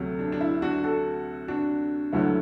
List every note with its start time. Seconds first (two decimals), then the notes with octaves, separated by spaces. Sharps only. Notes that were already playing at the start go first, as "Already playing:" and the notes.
Already playing: D2 C3 F#3 A3
0.19 D4
0.32 D4
0.41 E4
0.62 D4 F#4
0.84 F#4 A4
1.48 D4 F#4
2.13 D2 D3 F#3 E4